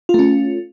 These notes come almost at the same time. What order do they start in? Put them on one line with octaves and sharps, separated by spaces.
F4 A3 C#4